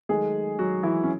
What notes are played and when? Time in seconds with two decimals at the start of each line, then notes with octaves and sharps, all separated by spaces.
0.09 D#3 F#3 G#3 A3 G#4
0.59 F#3 F#4
0.83 E3 E4
1.04 C#4